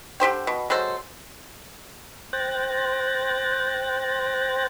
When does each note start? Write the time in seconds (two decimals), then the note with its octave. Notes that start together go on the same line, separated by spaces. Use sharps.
0.20 D3 G4 C5 G5
0.47 B2
0.70 F#3 G#3 A4 C5
2.33 C5 G5 F#6 A6 A#6